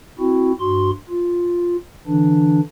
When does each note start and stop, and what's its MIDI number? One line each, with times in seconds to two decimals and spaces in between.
0.19 0.52 60
0.19 0.52 64
0.19 0.52 66
0.60 0.91 43
0.60 0.91 66
0.60 0.91 84
1.09 1.76 65
2.07 2.60 50
2.07 2.60 52
2.07 2.60 62